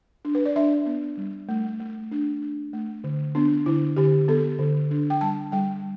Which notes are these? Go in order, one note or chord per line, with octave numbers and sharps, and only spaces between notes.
D4
B4
D5
D4 E5
B3
G3
A3
A3
D4
D4
A3
D3
B3 D4
D3 E4
D3 G4
B3 A4
D3
D4
G5
G3 A5
G3 G5